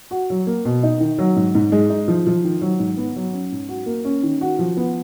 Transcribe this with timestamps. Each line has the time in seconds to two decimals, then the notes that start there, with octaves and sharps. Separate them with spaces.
0.11 F#4
0.30 F#3
0.47 A#3
0.65 B2
0.83 D#4
1.00 D#3
1.19 F#3
1.36 G#2
1.55 G#2
1.72 G#3
1.90 D#4
2.08 F3
2.27 F3
2.44 D#3
2.62 F#3
2.80 G#2
2.97 B3
3.16 F#3
3.33 C#4
3.52 G#2
3.69 F#4
3.86 A#3
4.05 C#4
4.23 D#3
4.41 F#4
4.59 F3
4.77 B3